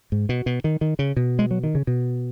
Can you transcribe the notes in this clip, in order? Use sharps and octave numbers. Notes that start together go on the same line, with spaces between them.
G#2
B2
B2
D#3
D#3
C#3
B2
G#3
F#3
D#3
C#3
B2